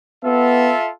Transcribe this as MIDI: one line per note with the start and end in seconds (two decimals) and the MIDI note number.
0.24 0.73 59
0.24 0.92 65
0.24 0.92 69
0.24 0.92 76